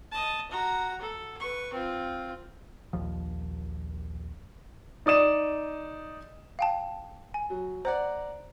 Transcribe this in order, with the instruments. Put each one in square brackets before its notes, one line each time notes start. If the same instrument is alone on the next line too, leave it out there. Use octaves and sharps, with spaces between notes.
[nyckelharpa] D#5 A5
F#4 A#5
A4
B4 C#6
C4 F4
[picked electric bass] A#1 D#2 F3
[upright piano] D#4 D5 D#6 E7
[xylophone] F5 G5 A5
G#5
[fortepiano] F#3
[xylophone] C5 [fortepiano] D5 F#5 A#5